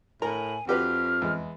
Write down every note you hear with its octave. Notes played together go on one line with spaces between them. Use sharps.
A2 A#4 G#5 A#5
F2 F#4 G4 B4 F6
E2 G#3